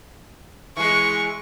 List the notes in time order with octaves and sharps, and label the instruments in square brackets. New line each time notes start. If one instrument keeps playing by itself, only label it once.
[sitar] E3 G#3 [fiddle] C#6